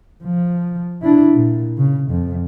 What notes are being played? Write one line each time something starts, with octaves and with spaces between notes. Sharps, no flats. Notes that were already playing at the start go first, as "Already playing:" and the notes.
F3
D4 E4
A#2
C#3
F2